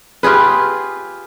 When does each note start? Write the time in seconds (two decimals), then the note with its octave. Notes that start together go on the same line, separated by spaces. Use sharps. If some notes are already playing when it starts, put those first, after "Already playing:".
0.23 F4 G4 G#4 B4